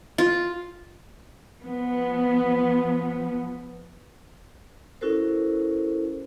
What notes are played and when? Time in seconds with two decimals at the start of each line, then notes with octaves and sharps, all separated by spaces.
0.18 F4
1.62 F3 B3
5.01 C#4 E4 F#4 A4 A#4 C5